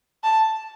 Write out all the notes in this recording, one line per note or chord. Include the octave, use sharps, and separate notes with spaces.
A5